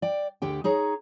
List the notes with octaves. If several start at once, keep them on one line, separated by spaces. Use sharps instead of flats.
D5 G5
D2 D3 G4 G5
D#4 G#4 C#5 A#5